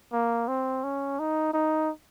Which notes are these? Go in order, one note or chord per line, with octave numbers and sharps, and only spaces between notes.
A#3
C4
C#4
D#4
D#4